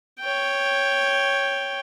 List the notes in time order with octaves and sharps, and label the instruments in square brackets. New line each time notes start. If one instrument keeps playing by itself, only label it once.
[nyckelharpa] C#5 G5